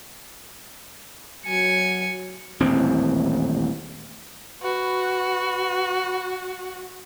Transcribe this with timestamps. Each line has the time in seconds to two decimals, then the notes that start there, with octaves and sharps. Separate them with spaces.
1.46 F#3 G#5 C#7
2.60 D#1 A1 E2 C4
4.63 F#4 B4